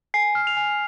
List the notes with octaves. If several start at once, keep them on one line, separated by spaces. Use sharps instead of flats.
G#5 C7
F6
F7
G#5